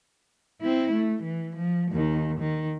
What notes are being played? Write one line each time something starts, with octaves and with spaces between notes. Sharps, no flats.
C4 E4
A3
E3
F3
D#2 D#3
D#3